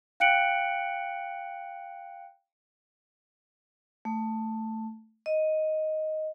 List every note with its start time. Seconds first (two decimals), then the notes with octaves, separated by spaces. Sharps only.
0.20 F5 G5 F#6 C#7 D7 F#7
4.05 A3
5.26 D#5